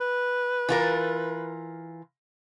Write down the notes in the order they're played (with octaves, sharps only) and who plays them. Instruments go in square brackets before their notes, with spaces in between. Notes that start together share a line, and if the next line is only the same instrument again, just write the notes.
[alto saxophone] B4
[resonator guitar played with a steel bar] E3 F4 A#4